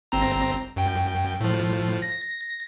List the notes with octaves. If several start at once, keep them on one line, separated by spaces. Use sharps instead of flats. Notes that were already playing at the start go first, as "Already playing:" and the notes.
G1 C4 A#5
F#2 G5
A2 F3
A#6